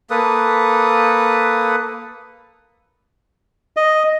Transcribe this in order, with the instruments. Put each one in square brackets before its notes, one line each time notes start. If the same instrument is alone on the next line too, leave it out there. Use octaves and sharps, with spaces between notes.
[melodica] A#3 A4 B4 D#6
[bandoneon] D#5